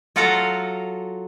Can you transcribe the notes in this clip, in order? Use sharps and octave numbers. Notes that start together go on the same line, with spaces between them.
F#3 F4 F#4 A4 F5 A#5